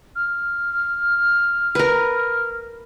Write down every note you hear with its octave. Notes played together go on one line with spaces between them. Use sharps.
F6
A#4 B4